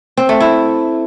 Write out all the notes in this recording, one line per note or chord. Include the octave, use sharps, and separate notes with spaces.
C4
A3
E4